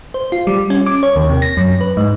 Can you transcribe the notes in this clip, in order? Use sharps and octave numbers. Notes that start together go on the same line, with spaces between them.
C5
F4
G3
C#4
D6
C#5
D#2
C3
A#6
F#2
B4
G#2